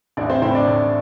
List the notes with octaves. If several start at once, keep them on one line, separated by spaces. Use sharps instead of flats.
A1 D4 D5
C4 C5
A2 C4 C5
D4 D5
A2